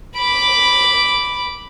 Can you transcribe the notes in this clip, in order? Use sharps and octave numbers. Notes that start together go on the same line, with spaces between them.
B5 D6